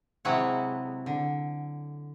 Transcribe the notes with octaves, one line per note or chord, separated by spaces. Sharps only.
C3 F#3 G#3 E4 C#5 F#5
D3